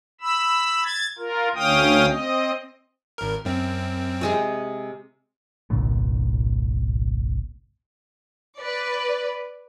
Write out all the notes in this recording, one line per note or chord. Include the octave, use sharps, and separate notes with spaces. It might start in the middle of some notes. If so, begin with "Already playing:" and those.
B5 E6
G#6 A6
F4 A#4
D2 C#4 F5 G5 D#6
C4 D#5
G#1 A#4
F#2 C4
C3 G#3 G#4
G1 C2 A#2 D3
B4 D5